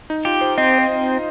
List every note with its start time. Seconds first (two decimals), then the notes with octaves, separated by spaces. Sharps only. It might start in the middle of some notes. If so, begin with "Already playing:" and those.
0.10 D#4
0.25 F4 G4
0.41 C5
0.58 C4 D#5
0.78 C5